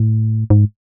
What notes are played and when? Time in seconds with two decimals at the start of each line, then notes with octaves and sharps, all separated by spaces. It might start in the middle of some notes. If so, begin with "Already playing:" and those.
Already playing: A2
0.50 G#2